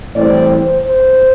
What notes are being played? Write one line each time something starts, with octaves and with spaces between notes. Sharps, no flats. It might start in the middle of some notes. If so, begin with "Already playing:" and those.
A2 E3 G3 C4 D5
C5
C5